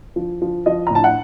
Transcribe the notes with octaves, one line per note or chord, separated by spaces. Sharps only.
F3
F3
F3 D#5
A#5
A2 A5
F#5